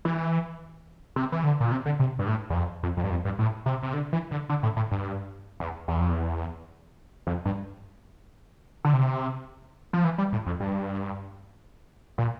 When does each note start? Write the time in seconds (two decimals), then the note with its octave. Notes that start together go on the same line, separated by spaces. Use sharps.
0.05 E3
1.16 C3
1.32 E3
1.44 D3
1.60 A#2
1.72 C3
1.86 D3
1.99 C3
2.19 G2
2.27 A2
2.50 E2
2.55 F2
2.83 F2
2.97 F2
3.04 G2
3.10 F2
3.25 G2
3.39 A2
3.66 C3
3.83 C3
3.94 D3
4.13 E3
4.31 D3
4.49 D3
4.63 A2
4.76 A2
4.91 G2
5.60 E2
5.88 E2
5.99 F2
6.10 E2
7.27 F2
7.45 G2
8.85 D3
8.93 C3
9.93 F3
10.04 E3
10.18 G3
10.32 A2
10.46 F2
10.60 G2
12.18 A#2